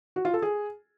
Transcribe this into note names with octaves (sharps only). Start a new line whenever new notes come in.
F#4
F4
A4
G#4